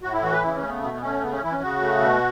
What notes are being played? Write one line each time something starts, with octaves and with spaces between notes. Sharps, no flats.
A2 F#4
E4
E3 F#4
B4
C#3 E4
C#4
A3
B3
B2 B3
B3
A3 C#4
C#3 B3
C#4
E3 E4
C#4
C#3 F#4
A3
B2